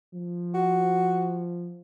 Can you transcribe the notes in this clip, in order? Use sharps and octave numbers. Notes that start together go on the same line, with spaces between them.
F3
F#4